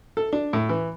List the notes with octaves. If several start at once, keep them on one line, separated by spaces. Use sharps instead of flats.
A4
D4
A2
E3